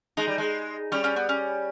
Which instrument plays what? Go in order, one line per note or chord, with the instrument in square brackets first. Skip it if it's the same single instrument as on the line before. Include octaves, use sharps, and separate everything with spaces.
[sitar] G#3 [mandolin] D#4
[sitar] G3
G#3
[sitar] G3 [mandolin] C#4
[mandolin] C#4
B3
C#4